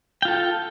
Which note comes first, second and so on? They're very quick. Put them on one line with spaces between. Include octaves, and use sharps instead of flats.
G5 F4 A4